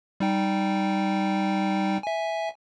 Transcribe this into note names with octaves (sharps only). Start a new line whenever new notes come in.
G3 D#4 G5
E5 G#5